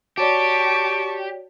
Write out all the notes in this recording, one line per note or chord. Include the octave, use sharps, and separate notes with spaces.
F#4 G4 C#5 D5 A5 C#6 D7